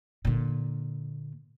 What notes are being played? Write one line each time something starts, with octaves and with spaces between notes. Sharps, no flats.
A#2 D3